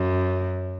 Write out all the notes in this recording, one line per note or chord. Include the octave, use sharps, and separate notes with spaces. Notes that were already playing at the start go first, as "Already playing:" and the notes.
Already playing: F#2